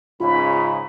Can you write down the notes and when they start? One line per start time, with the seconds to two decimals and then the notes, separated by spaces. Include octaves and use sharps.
0.20 G#2 C#3 F4 B5